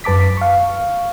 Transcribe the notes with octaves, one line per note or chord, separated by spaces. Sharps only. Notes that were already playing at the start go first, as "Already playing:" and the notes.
F#2 B4 A5 D6 B6
F5 C#6